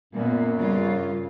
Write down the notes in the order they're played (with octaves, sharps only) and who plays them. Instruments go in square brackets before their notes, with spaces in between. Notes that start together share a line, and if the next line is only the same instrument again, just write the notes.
[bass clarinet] F#2 [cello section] A#2 B3
[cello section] G2 C#3 F4